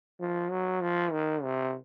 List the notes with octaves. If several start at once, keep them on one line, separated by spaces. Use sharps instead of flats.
F3
F#3
F3
D#3
C3